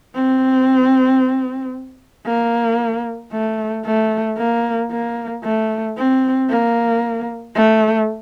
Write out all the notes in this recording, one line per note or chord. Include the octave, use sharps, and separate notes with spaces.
C4
A#3
A3
A3
A#3
A#3
A3
C4
A#3
A3